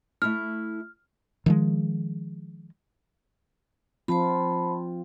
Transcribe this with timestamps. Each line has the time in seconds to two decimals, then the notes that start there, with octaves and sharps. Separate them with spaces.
0.22 A3 E4 A5 F6
1.46 D#3 F3 G#3
4.08 F3 C4 F4 C5 A5 B5